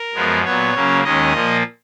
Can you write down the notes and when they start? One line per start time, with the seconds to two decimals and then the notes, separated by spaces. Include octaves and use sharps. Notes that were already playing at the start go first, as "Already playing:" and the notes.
Already playing: A#4
0.14 F#2 F3 G#3 B3
0.44 A#2 F#3 B3 C#5
0.74 C#3 F#3 A#3 C#4
1.03 D#2 D#3 G#3 C#4 D#5
1.33 A#2 F3 A#3